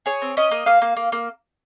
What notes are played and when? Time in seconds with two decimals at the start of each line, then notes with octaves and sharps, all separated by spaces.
0.06 G#4 C#5
0.22 C4
0.37 C#4 D#5
0.51 A#3
0.66 A#3 F5
0.82 A#3
0.97 A#3
1.12 A#3